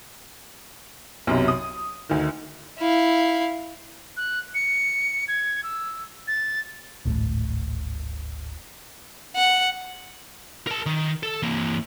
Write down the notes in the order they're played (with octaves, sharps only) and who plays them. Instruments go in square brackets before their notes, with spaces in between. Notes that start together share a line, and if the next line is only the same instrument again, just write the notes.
[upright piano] B1 F#2 C3
D#6
D2 D#3
[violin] E4 F5
[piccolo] F#6
C#7
G#6
E6
A6
[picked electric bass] D1 G#1 A2
[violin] F#5
[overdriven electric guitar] A#4 A5
D#3
A4
E3 A#3